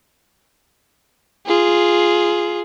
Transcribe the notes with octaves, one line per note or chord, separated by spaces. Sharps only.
F4 G#4